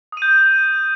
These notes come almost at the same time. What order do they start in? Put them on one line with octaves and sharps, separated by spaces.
D#6 D#7 G6